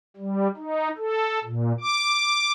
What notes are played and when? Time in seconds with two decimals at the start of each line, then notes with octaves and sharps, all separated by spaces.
0.16 G3
0.57 D#4
0.98 A4
1.44 A#2
1.81 D6